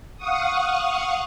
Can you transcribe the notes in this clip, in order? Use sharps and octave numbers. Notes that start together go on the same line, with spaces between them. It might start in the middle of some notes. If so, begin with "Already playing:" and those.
F5 F#5 C#6 D#6